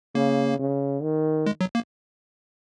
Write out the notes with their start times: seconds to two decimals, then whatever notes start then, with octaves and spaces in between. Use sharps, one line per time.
0.15 C#3 A#3
0.60 C#3
1.03 D#3
1.46 G#3
1.61 F#3
1.75 A#3